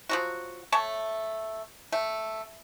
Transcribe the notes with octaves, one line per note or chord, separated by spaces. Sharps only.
F3 F#3 F#4
A3 C#5 A5
A3